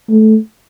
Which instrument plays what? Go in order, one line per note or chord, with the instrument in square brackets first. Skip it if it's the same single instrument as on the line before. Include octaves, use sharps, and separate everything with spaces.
[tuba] A3